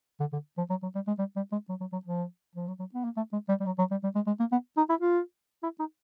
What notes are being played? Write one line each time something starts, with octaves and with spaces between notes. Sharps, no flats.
D3
D3
F3
F#3
F#3
G3
G#3
G3
G3
G#3
F#3
F#3
F#3
F3
F3
F#3
F#3
B3
A#3
A3
G#3
G3
G3
F#3
F#3
G3
G3
G#3
G#3
A#3
B3
D#4
E4
F4
E4
D#4